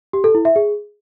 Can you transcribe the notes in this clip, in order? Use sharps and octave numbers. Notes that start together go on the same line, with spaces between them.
G4
A4
E4
E5
G#4